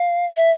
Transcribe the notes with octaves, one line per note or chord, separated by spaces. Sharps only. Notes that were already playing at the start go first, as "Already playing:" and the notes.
Already playing: F5
E5